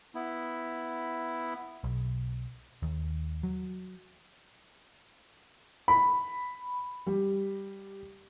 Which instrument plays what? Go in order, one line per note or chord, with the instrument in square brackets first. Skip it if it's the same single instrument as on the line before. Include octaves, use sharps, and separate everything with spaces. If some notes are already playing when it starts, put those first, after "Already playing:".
[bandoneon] B3 E4
[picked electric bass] B1
D#2
F#3
[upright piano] B5
[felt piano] G3